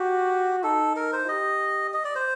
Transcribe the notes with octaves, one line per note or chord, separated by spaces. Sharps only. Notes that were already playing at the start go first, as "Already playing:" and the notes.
Already playing: F#4 G4
D#4 A4
A#4
C5
G4 D#5
D#5
D5
C5